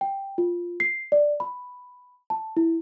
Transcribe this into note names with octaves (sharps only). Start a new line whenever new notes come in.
G5
F4
C7
D5
B5
A5
E4